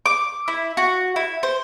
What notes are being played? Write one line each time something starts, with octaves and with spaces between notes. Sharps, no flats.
D6
E4
F#4
E4
C5